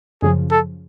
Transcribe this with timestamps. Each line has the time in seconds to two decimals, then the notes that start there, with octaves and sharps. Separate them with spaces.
0.22 F#2 C#3 F3 G#4
0.51 A4